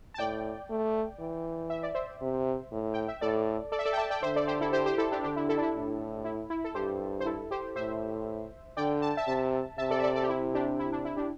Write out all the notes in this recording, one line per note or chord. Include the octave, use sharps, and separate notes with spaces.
A5
A2 D5 G5
A3
E3
E5
D5
C5 E5
C3
A2
G5
E5
A2 A4 D5
A4 D5
E5
A4 D5
G5
E5 A5
D5 G5
D3 C5 E5
A4 D5
G4 C5
E4 A4
G4 C5
G4 C5
E4 A4
D4 G4
D3 D4 G4
E4
E4 A4
D4
E4
A2
E4
E4
A4
G2 G4 C5
C5
E4 A4
G4 C5
A2 C5 E5
D3 D5 G5
A5
E5 A5
C3 E5 A5
C3 E5 A5
A4 D5
E5
A4 D5
A4 D5
G4
E4
D4 G4
E4
D4
E4
D4 G4